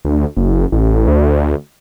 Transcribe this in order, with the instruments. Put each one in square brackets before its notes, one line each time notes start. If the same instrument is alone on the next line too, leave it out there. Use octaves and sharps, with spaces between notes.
[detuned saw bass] D2
F#1
A1
D2